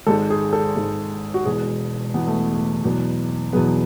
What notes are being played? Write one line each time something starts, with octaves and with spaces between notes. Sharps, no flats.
G#1 G#2 G#3 A4
G#4
A4
G#1 G#2 G#3
F#4
E1 E2 B2 G#4
E1 E2 B2 B3
A3
A3
E2 B2 F#3 B3
E2 B2 F#3 B3 G#4